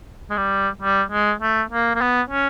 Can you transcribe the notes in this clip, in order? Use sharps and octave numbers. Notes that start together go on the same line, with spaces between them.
G#3
G3
G3
G#3
A3
A#3
A#3
B3
C#4